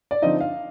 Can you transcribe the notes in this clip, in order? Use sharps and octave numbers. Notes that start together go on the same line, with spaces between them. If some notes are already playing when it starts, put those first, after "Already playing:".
D5
D3 F3 C4 D#4 D#5
F5